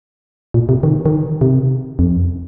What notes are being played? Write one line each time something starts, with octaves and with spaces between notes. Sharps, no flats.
A#2
C3
D#3
D#3
C3
F2